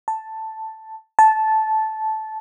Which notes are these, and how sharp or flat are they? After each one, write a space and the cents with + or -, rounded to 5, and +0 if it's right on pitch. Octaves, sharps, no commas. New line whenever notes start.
A5 +5
A5 -10